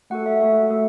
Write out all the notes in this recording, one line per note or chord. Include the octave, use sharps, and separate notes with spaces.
A3 F#4 A4 F#5
E5
A3 F#4 A4 E5
A3 F#4 A4